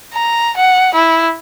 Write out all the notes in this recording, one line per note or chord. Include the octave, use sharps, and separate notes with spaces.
A#5
F#5
E4